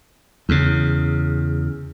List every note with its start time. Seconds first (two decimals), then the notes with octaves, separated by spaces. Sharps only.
0.49 E2 C#3